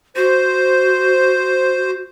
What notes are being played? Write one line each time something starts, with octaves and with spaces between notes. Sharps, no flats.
F#4 C5